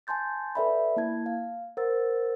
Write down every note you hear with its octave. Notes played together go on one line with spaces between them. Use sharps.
G#5 A5 C6 G6 A6
A4 B4 D5 E5 G5 B5
A#3 E4 A5 G#6
F5
A#4 C5 F#5 E6 A6